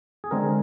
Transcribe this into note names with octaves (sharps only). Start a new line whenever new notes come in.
G#4
D3 G#3 C4 A#4